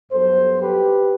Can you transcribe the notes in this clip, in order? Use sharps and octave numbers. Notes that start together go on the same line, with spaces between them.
G2 F#3 B3 A4 C5
G4 B4